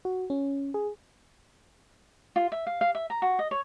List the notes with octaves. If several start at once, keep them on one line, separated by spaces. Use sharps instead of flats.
F#4
C#4
G#4
F4
E5
F5
F5
E5
A#5
F#4
D#5
C#5